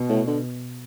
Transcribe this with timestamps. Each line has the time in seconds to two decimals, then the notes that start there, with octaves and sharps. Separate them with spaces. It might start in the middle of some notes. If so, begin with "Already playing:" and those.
Already playing: B2
0.09 A2
0.27 D3